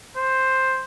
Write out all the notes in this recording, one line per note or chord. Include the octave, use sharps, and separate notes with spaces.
C5